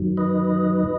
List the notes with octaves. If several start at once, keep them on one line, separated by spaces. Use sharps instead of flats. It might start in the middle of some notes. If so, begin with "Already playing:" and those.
Already playing: F#2 D#3 F#3
B4 D#5